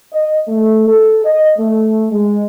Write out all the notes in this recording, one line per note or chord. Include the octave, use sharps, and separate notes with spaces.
D#5
A3
A4
D#5
A3
G#3